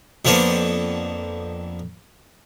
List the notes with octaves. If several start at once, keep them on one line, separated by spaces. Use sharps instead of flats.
F2 F3 A#3 B3 D4